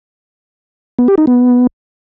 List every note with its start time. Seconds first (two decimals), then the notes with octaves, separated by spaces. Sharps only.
0.99 B3
1.08 G4
1.18 D#4
1.27 B3